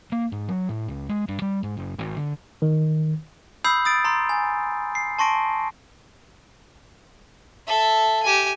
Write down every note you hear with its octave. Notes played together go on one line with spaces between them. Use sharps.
A#3
G#2
F#3
A2
C#2
G#3
G2
G3
G#2
F#1
G#1
D3
D#3
B5 D#6 E6 G6 C7
D#6 A6 D7
A#5 C6
G#5
C7
A5 C6 C#6 A#6 D7
A4 E5
G4 G#5